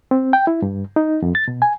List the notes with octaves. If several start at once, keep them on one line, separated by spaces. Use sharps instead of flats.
C4
G5
E4
G2
D#4
F2
A6
B2
G#5